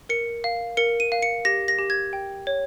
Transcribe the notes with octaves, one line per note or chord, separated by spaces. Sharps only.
A#4 C#7
F5
A#4 C#7
D#7
F5
C#7
G4 A#6
A#6
G4
G#6
G5
C#5